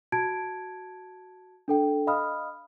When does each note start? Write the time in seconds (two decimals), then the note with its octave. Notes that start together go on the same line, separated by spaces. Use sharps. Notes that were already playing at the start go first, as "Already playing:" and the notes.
0.12 F#4 A5 G#6 D7
1.68 D4 A4 G5
2.07 D#5 F5 B5 D#6 F6